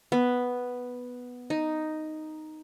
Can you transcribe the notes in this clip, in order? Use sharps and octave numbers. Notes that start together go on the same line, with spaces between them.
B3
D#4